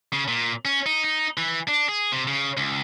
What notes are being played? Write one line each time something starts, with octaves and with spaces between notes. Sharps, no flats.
C#3
A#2
C#4
D#4
D#4
E3
D4
G#4
C3
C#3
C#2